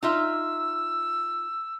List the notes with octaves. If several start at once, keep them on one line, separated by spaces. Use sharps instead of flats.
D#4 F4 E5 E6